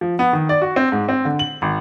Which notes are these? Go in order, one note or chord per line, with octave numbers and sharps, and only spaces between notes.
F3
B3
D#3
D5
F#4
C4
G#2
C4
D3
F#7
G#1